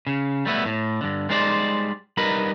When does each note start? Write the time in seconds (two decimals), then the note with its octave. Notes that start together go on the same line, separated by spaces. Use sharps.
0.07 C#3
0.46 G3 A3 B3 E4
0.66 A2
1.01 G2 D3
1.29 G3 G#3 D#4 C5 D5
2.17 G3 D#4 A#4 B4 B5